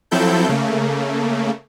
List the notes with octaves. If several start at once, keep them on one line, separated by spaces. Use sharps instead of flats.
F3 F#3 C4 E4 A4 G6
C#3 A3 A#3